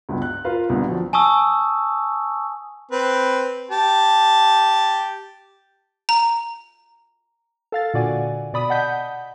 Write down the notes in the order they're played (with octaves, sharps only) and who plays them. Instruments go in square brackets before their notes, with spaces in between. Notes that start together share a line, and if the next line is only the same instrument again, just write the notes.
[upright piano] C#2 G2 B3
F#6
F4 A#4 B4 F5
C2 B2 D3
F3 F#3
[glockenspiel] G#5 A5 C#6 D#6 E6
[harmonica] C4 B4
G4 A5
[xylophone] A#5
[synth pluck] A4 F5 A6
A#2 D3 F#4 D5 F#5 G#5
B2 D5 B5 D#6
D#5 F#5 A5 G6 B6